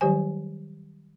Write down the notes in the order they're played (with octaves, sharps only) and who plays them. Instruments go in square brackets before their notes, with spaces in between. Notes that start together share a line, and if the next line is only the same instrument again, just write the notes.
[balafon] D#3 F#3 G3 G4 C5 G#5